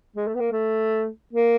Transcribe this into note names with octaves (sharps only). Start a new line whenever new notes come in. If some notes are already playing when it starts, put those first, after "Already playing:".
G#3
A3
B3
A#3
A3
A#3